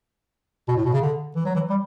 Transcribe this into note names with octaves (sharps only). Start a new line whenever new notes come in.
B2
A2
B2
C#3
D3
E3
F#3
E3
G3